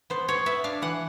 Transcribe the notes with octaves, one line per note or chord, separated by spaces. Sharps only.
B3 C5
B3 C#5
B3 E5
D4 F5
E3 F#5